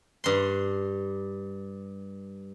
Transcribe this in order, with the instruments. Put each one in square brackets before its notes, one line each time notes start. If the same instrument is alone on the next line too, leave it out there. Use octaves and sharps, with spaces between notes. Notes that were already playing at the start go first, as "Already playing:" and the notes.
[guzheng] G2 C6